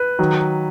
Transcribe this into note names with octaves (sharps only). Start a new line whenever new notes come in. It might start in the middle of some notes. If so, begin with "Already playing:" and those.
Already playing: B4
D#3 F#3